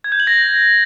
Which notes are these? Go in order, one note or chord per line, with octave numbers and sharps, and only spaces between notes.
G#6
G6
F#7
A#6